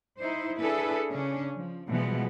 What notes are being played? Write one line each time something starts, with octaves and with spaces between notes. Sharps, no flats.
D#4 E4 C5
D4 E4 G#4 A4 B4
C#3 C#4 D4
F3
B2 E3 F3 G3 G#3 B3